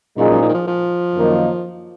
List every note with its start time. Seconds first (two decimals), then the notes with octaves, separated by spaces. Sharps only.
0.17 F#2 A#2 F3 G#3 D#4 G#4
0.31 F#2
0.42 G#2
0.49 D#3
0.54 F3
0.67 F3
1.15 F#2 D#3 A#3 D#4